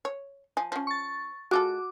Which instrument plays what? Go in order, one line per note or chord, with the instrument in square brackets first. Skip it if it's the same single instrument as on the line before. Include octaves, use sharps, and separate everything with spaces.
[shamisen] C#5
F3 G#5
F3 C#4
[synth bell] C#6 A6
[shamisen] G#3 F4 A4 [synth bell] F#4 D6